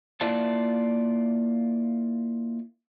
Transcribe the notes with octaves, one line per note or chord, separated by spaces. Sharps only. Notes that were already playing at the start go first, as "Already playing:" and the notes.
A#3 E4 F4 D5 E5 A5